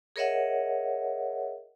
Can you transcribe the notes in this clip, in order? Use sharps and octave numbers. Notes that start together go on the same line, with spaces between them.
G#4 A#4 C#5 D#5 E5 F#5